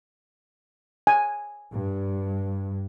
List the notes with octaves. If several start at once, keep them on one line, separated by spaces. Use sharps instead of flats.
G#5
G2